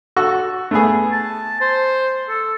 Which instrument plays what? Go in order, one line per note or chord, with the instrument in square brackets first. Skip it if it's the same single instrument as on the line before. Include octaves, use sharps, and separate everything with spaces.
[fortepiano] F#4 A4 C#6
A3 B3 G#4
[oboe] A5
C5
A4